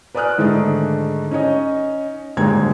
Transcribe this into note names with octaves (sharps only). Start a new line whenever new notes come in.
B4 D5 G#5 D#6 F6 F#6
G#2 D3 D#3 A3 D4
C#4 D#4 C#5 D#5
D#1 D#2 G#2 D3 G#6